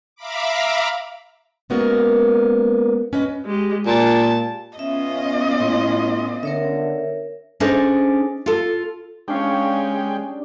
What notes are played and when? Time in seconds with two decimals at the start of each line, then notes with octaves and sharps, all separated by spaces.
0.16 E5 F5 A#5 B5 D6
1.70 G#3 A#3 B3 C#4 F#4 A#4
3.13 C#4 B4 D#5
3.45 G#3 G4
3.87 A#2 A5
4.79 B3 C#4 F4 D#5 E5
5.60 A2 C6
6.43 D3 A#4 C#5 E5
7.60 C#4 D4 G#4 A4 C5 D#5
8.46 F4 A4
9.28 G#3 C#4 D4 G4 C#5 F5 G5